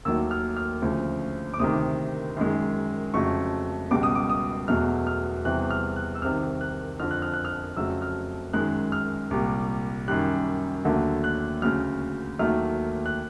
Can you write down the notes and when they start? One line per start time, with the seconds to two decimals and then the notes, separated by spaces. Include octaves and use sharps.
0.05 D#2 D#3 F#3 A3 E6
0.31 F6
0.57 F6
0.82 D2 C#3 F3
1.54 D6
1.59 D2 C3 D#3 D#6
2.37 F#2 D#3 G#3
3.14 F2 C#3 F#3 A3 C#6
3.91 C#2 B2 G3 D6
4.03 D#6
4.15 D6
4.30 D#6
4.68 E2 B2 F#3 A3 F6
5.07 F6
5.45 E2 C3 E3 G3 F#6
5.71 F6
5.96 F#6
6.15 E6
6.22 C2 C3 D#3 F6
6.61 F#6
7.00 F2 D3 F3 F6
7.11 F#6
7.22 F6
7.34 F#6
7.45 F6
7.77 F2 C#3 F#3 A3 E6
8.02 F6
8.53 F#2 D#3 G#3 F#6
8.92 F6
9.31 C2 A#2 G3
10.08 F#2 D#3 G3 F#6
10.85 D#2 D3 F#3 A3
11.24 F#6
11.62 D2 C#3 F#3 F6
12.39 D#2 D#3 F#3 A3 F6
13.06 F#6